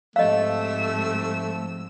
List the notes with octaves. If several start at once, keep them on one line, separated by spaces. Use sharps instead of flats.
G#2 C3 F3 A3 D#5 F5 E6